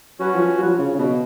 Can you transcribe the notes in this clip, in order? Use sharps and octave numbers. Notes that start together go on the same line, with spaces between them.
F#3 C#4 F#4 B4
F3
F#3
F3
C#3
C#3
B2